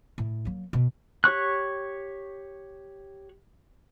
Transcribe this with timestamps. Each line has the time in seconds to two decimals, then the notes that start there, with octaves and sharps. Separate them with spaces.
0.18 A2
0.45 F#3 A#3
0.73 B2
1.24 G4 C#5 C#6 F#6